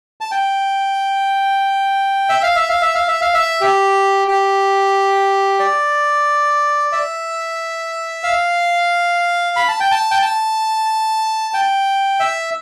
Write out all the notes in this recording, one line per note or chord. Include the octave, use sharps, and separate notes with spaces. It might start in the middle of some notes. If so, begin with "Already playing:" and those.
A5
G5
E5
F5
E5
F5
E5
F5
E5
F5
E5
G4
G4
D5
E5
F5
B5
A5
G5
A5
G5
A5
G5
E5